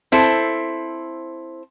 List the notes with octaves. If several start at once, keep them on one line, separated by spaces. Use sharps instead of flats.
C4 E4 A4 C5